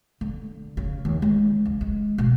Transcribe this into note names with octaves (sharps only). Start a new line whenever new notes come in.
D3
C#3
D#2
G#3
C#2
G#3
B2